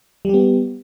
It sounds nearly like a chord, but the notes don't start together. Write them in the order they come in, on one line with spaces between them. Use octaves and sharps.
G3 G4 B3